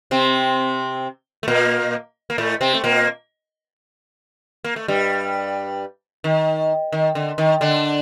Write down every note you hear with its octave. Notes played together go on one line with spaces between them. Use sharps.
C3 C4
A3
A#2 A#3
A#3
A2 A3
C3 C4
A3
A#2 A#3
A#3
A3
G2 G3
D#3
D#3
D3
D#3
D3 D4